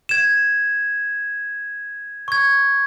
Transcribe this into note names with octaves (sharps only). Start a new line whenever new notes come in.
G#6 E7
C#6 G#6